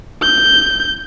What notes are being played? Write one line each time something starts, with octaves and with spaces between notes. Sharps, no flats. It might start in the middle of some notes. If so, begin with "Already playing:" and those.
G6